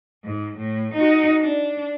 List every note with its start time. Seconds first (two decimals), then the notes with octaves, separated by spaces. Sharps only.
0.24 G#2
0.58 A2
0.93 D#4 F#4
1.40 D4